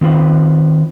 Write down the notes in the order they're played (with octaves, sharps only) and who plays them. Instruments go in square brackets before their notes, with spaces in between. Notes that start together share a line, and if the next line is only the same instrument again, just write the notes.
[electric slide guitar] D#3 C4 F4 B4